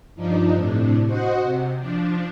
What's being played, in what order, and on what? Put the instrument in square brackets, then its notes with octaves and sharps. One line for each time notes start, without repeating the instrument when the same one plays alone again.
[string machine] G2 F3 D4 D#4
A2 C3 D4
F#4 C5 D#5 F#5
C3
F3 D4